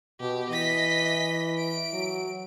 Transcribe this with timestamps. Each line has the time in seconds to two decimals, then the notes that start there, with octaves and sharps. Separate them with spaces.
0.20 B2 G4
0.50 E3 D#5 B6
1.58 D7
1.93 F#3